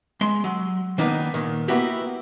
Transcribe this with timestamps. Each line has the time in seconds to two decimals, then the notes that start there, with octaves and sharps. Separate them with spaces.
0.21 G#3 C6
0.44 F#3
0.98 D#3 A#3 B3 D4 D#4
1.34 A#2 D#3
1.68 A#3 B3 E4 F#4 G4